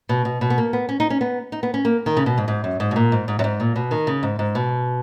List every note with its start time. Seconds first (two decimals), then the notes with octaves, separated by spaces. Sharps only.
0.09 B2
0.25 B2
0.41 B2
0.50 B3
0.58 A#3
0.73 B3
0.89 C#4
1.00 D#4
1.10 C#4
1.21 B3
1.52 D#4
1.63 B3
1.74 C#4
1.85 A#3
2.06 D#3
2.17 C#3
2.26 B2
2.38 G#2
2.48 G#2
2.64 F#2
2.80 G#2
2.91 B2
2.96 A#2
3.12 G#2
3.28 G#2
3.39 F#2
3.44 G#2
3.60 A#2
3.76 B2
3.91 D#3
4.07 C#3
4.23 G#2
4.39 G#2
4.55 B2